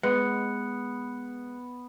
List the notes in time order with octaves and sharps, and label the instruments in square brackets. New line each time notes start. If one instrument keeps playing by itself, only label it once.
[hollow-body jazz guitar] G#3 [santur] B3 [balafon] B4 [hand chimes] F#6 C#7